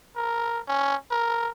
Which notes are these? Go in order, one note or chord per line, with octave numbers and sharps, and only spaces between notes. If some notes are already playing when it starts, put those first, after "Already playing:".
A#4
C#4
A#4